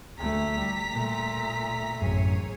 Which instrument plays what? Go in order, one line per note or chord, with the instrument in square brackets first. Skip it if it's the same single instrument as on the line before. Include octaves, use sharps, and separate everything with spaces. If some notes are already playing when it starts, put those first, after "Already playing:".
[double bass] D2 A3 [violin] A#5 B6
[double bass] G3
A#2 A3
[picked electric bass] A1 F#2 [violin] G#4 C#5